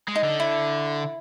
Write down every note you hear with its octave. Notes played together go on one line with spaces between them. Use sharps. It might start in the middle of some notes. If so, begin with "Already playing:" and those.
G#3
D#4
D3
E4